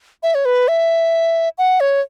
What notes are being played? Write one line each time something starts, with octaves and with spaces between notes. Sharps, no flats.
E5
C#5
B4
E5
F#5
C#5